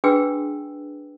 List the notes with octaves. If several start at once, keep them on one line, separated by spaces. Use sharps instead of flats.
D4 F#4 G#4 B4 G5 E6